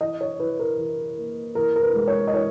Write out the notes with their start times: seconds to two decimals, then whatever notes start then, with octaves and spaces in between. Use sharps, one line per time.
0.01 E3 D#5
0.21 C#5
0.40 E3 B4
0.59 A#4
0.78 E3
1.17 A#3
1.55 E3 A#4
1.76 A#4
1.82 B4
1.95 G#3
2.08 C#5
2.27 D#5
2.34 E3 C#5